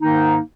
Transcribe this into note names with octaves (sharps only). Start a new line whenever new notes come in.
G#2 D#3 A#3 D#4